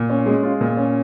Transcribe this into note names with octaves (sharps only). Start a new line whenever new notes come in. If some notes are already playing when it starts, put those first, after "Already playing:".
Already playing: A#2
C#4
G#3
F4
A#2
C#4